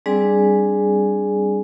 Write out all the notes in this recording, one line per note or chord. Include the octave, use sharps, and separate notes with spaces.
G3 C4 D4 G#4 D5 G#5